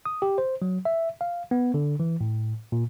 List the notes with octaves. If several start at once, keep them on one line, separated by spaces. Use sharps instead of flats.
D#6
G4
C5
F#3
E5
F5
B3
D3
E3
A2
A#2